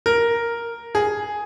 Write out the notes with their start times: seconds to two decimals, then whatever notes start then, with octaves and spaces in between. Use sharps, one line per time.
0.06 A#4
0.95 G#4